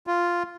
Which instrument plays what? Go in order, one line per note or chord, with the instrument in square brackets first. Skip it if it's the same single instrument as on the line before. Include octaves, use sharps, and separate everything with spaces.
[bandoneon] F4